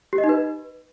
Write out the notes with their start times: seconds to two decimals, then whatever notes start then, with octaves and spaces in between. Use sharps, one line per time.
0.13 G4
0.18 D#5
0.24 D#4
0.29 B4